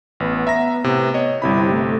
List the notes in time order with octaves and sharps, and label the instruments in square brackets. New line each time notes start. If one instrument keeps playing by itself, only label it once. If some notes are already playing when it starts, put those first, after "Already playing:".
[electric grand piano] A1 [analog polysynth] B3
[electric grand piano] E5 A#5 A#6
A2 C3
C#5 D#5
[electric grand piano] G1 C3 B5 [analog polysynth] G3 C4 E4
[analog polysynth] A3